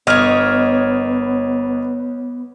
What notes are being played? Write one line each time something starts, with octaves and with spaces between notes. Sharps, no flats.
G1 B3 C#5 D#5 F6